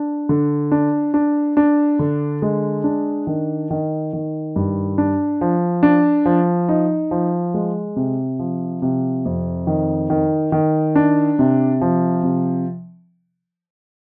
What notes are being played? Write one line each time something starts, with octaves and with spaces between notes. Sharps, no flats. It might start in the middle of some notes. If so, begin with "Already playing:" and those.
Already playing: D4
D3
D4
D4
D4
D3
G#3
D4
D#3
D#3
D#3
G2
D4
F3
D4
F3
D#4
F3
G#3
C3
F3
C3
F2
D#3
D#3
D#3
D4
C3
F3
C3